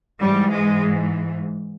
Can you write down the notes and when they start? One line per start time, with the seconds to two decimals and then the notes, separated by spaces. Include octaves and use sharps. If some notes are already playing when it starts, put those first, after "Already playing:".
0.21 G#2 E3 G3
0.50 G#3